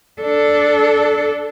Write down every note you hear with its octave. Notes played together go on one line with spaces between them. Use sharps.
D4 A4